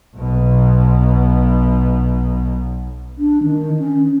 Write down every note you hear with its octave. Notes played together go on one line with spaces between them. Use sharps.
B1 B2
D4
D#3
C#4